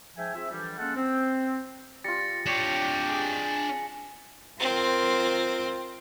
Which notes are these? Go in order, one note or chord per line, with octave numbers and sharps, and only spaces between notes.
G#2 F3 E5 G5 G#5
C4 F4 G#4 E5
D3 E3 F3 G3
G#3 A#3 C#4 F4 A4 F#5
C4
G3 F4 A6 A#6 C#7
D4 G4 C#5 A#6 B6 C#7
G#3 G#4
C4 F4 A#4